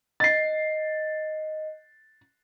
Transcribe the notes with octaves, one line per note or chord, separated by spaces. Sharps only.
D#5 A6 C7